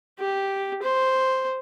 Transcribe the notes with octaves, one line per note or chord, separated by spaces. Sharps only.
G4
C5